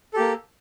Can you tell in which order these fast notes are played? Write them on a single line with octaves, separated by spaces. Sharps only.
A4 G4 A#3